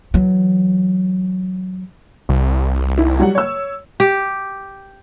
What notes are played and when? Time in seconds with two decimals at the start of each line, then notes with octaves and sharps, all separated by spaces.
0.14 E3 F#3
2.29 C2
2.97 D#3 E4
3.19 F#3 G3 F#5
3.35 C#5 E6
4.00 G4